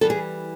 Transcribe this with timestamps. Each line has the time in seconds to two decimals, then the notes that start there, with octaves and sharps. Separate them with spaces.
0.01 E3 G3 A4
0.10 G#4